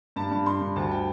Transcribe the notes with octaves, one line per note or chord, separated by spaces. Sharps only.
G2 A5
G2
G2 C6
G2
D2 A5
G5